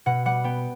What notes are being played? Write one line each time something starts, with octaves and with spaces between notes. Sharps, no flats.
B2 F#5
G3 F#5
B3 G5